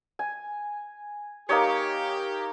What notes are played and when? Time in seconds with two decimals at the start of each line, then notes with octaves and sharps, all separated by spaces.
0.19 G#5
1.49 A#3 D#4 G4 C#5